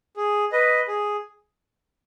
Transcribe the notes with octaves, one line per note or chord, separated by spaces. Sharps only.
G#4
B4 D#5
G#4